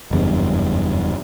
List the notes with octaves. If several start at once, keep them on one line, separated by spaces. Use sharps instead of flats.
F#1 E2 G2